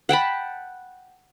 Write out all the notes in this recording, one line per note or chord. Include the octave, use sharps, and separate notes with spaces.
F#5 G5 A5 B5